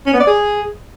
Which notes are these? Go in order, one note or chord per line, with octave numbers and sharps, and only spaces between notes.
C#4
B3
D5
G#4